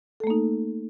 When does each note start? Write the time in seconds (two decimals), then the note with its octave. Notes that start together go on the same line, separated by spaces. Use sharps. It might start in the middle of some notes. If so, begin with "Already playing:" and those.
0.20 A4
0.24 A3
0.27 A#3
0.30 D#4